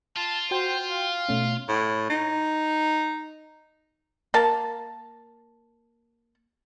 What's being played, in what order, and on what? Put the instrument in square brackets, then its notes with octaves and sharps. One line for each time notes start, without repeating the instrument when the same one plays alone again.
[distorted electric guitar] F4 [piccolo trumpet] A5
[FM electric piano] F#4 G5 C6 [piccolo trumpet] C5
[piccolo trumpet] F5
[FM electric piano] B2 A3 C#4
[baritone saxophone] A2
D#4
[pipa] A#3 A5